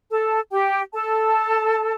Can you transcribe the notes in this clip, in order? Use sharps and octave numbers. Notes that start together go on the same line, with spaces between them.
A4 A5
G4 G5
A4 A5